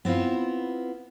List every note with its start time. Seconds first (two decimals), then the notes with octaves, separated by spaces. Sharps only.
0.05 B3 C4 E4 F4